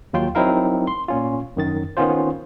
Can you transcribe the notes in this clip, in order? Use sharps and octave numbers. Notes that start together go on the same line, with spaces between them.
D#2 F#3 F4 G5 C6
F#3 C4 D#4 E4 A#4 F5
C6
A#2 C#4 F4
F#2 D#3 A6
D#3 B3 C#4 F4 C5